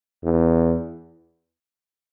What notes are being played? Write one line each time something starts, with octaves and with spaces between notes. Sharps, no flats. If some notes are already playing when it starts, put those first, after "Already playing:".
E2